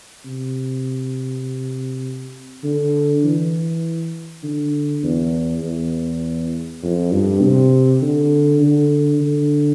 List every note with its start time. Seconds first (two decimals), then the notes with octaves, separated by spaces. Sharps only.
0.25 C3
2.64 D3
3.24 E3
4.43 D3
5.03 E2
5.62 E2
6.83 F2
7.13 G2
7.42 C3
8.02 D3
8.61 D3
9.21 D3